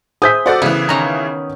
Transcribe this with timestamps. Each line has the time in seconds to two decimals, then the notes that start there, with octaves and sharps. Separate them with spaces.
0.22 G#4 C5 E5 D#6 G6 B6
0.46 F#4 A4 C5 D5 F#5
0.62 C#3 E3 B3
0.89 D#3 C#4 A#5